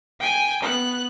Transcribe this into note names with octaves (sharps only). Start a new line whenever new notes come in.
G5 G#5
B3 F#6